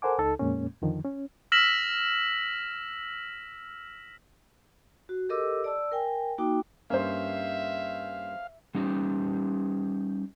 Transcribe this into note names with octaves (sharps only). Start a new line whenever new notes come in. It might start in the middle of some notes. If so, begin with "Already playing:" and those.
A4 A#4 C5 F#5 G#5 D6
C#2 D#4 A4
F2 A#2 G#3 A#3 C#4
F2 D3 D#3 F3
C#4
E6 F6 A#6 B6 E7 F#7
F#4
G4 A4 A#4 D#5 D6 E6
D5 A5 E6
A#4 G5 G#5
A#3 D#4 F#4 G5 D6
G2 A#3 C#4 C5 E5 F5
G3 C#4 D#4 G4